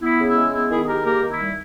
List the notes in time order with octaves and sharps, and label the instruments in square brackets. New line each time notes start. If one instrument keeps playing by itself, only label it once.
[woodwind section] B3 E4
C#3
E4
G#3
B3 E4
D#3 E4 G#4
G#4
G#3 G4 A#4
A#3 G4 A#4
D#3
E4
G3